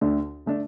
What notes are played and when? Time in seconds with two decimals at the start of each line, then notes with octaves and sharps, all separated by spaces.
0.01 D2 D3 A3 D4
0.46 D3 A3 D4